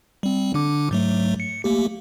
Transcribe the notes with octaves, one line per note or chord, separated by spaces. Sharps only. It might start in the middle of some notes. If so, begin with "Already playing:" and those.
G3 C4
D3 D4 D6
G#2 F#3 A3
C#7
A3 A#3 G4